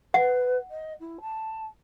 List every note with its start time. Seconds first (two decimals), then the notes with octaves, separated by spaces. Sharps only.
0.14 B4 F#5
0.70 D#5
1.00 E4
1.21 A5